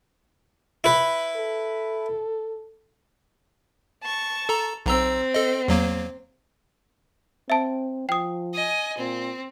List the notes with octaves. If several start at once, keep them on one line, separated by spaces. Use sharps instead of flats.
E4 B4
A4
A5 C#6
A4 A#5
B1 C4 A#5 E6
A4 D#5
E2 F#3 A#3
C4 E5 A5
F3 G5 D#6
D#5 G#5
A#2 C4